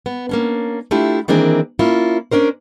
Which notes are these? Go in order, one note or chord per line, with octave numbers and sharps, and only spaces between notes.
B3
A#3 C#4 D4
A3 D4 E4 F4 G4
D#3 E3 A#3 C4 D4 G#4
A#3 C#4 E4 F4
C#4 D4 A#4 C5